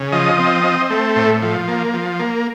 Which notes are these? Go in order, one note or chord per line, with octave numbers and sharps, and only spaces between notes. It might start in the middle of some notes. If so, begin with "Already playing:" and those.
Already playing: C#3
F3 D#5
C4
C4
A3
A2
F3
A#3
F3
A#3